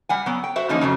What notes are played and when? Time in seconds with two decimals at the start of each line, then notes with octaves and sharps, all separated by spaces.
0.09 G3 F#5 G#5
0.26 F#3 B3
0.44 G5
0.56 F#4 C5 E5
0.69 D3 E3 F3 A#3 C#4 D#4
0.81 F2 C#3 F#3